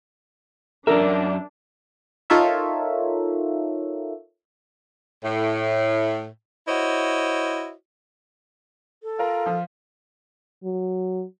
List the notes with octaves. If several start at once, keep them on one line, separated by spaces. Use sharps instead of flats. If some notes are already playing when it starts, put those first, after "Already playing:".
F#2 D4 A#4 D5 E5
D#4 F4 A4 A#4 C#5 E5
A2
E4 F#4 C5 C#5 D#5
A4
F4 A#4
F3
F#3